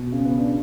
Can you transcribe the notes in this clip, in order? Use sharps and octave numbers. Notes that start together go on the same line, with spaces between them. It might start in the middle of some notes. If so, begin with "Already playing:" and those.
Already playing: B2
C#3
B3
D4